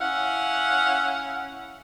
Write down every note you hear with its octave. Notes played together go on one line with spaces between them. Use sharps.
C#4 E4 F5 F#5